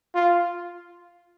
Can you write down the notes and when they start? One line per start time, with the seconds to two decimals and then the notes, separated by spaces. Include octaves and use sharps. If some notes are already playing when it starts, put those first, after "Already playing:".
0.15 F4